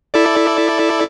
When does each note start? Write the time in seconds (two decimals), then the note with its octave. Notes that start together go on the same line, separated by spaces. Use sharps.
0.14 E4 A4 D5